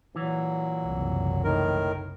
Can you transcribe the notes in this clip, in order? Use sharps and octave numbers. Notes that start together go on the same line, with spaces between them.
A#2 E3 F#3
F#1 C2
A2 D#3 A#4